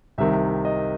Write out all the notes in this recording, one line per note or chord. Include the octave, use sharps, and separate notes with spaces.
C2 C3 D#3 E5
D#5